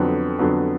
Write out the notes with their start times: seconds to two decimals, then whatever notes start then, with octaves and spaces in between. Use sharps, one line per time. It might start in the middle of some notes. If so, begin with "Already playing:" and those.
Already playing: F2 D3 F#3 B3
0.39 F2 D3 F#3 B3